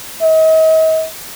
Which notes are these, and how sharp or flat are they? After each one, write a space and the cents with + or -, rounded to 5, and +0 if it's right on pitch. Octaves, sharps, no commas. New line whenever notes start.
D#5 +40